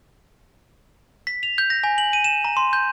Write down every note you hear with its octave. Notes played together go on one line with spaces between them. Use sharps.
B6
F7
G6
A#6
G#5
F#7
D#7
E7
A#5
C6
G6